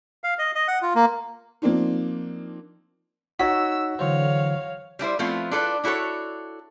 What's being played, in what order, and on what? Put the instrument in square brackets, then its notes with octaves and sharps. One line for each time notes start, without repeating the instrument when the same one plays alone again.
[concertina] F5
D#5
D#5
F#5
F4
A#3
[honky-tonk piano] F3 A#3 C4 D4 D#4
[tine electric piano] D#4 C#5 B6 [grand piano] F#4 [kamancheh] E6
[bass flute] D3 [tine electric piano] E3 F#3 C5 [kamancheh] C#5 F5
[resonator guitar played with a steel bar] G3 D4 E4 C5
F3 A3 B3 C4 E4 F4
D4 E4 F4 A4 B4 D5
D4 E4 F#4 A4 C#5